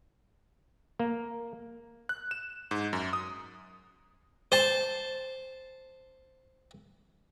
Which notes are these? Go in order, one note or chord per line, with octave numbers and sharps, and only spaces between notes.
A#3
F#6
E7
G#2
F#2
D#6
C5 A5